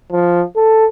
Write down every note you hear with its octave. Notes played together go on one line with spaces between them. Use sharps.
F3
A4